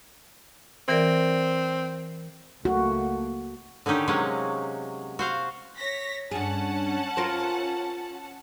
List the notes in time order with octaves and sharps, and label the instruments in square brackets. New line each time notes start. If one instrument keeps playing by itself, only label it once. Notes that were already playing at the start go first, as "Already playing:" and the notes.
[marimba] E3 A#4 D5 [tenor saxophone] C4
[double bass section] C#2 A3 A#3 [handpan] F#4
[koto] D3 D#3 C#4 D#4 G4
C3 F#3 G#3 A#3 C#4
F#4 C5 F5
[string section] C#5 A#6 B6
[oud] G2 G#4 [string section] C#4 F#5 A5
[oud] F4 A#4 C5